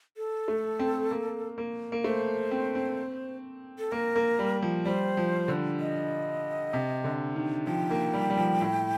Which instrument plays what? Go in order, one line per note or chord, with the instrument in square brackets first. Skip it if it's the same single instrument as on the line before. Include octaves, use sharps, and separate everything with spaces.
[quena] A4
[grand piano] A3
C4
A#3
A#3
A#3
[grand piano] A3 [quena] C5
[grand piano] C4
C4
[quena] A4
[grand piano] A#3 [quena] A#4
[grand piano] A#3
G3
F3
[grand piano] G3 [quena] C5
[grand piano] F3
D3
[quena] D#5
[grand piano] C3
D3
D#3
[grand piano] F3 [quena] G5
[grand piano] A#3
G3
G3
F3
A2